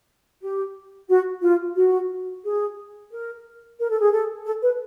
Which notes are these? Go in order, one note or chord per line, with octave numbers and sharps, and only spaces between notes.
G4
F#4
F4
F#4
G#4
A#4
A#4
A4
G#4
A4
A4
B4